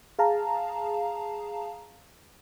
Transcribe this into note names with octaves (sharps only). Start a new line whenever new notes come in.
G#4 F5 A5 A#5